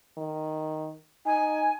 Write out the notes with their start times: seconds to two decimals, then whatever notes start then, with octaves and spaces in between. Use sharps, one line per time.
0.17 D#3
1.26 D#4 G#5